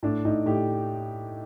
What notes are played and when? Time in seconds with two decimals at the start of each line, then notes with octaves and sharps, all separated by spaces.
0.03 A2 D4
0.25 A2 D#4
0.46 A2 G4